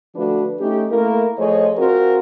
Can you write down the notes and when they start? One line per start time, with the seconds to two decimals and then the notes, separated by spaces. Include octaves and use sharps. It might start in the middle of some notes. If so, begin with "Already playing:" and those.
0.16 D3 F3 A3 D4 F#4 B4
0.60 A3 C#4 D#4 G4
0.90 A3 A#3 E4 A#4
1.38 F3 A3 G#4 C5 C#5 D#5
1.78 C4 F4 F#4 G#4 A#4 C5